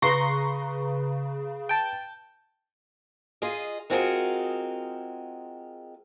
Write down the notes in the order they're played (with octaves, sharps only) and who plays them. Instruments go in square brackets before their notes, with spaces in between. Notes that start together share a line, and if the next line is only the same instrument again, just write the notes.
[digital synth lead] C#3 [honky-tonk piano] B4 A#5 C#6 [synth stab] C6 A#6
[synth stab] G5 A5
[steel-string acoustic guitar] F4 G#4 D#5
G#3 C4 F4 F#4 G#4 A#4